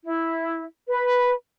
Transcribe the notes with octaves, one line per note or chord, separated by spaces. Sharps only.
E4
B4 B5